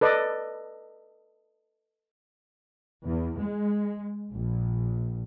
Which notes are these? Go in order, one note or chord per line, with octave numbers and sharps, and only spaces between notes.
A4 B4 D5 D#5
E2
G#3
A#1